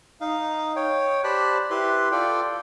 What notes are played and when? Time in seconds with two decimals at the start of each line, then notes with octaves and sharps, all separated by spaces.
0.21 D#4 F5
0.76 C#5 G5
1.24 G4 C5 D5 A5 B5 F#6
1.70 E4 G4 B4 C6
2.12 F4 A4 D5 G5